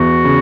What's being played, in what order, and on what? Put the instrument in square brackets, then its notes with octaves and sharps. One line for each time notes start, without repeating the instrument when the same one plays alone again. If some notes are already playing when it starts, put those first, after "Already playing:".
Already playing: [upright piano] E2 [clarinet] F#4
[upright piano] C#3